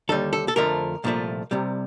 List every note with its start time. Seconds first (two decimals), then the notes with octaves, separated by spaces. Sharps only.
0.09 D#2 D3 G3 A4
0.33 A4
0.48 A4
0.56 F2 D3 F3 A3 A#4
1.04 C2 A#2 F3 A3
1.51 C2 C3 G3